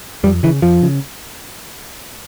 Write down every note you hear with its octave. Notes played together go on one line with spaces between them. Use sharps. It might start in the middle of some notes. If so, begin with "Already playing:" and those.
F2 G3
C#3 E3
F2 F3
C#3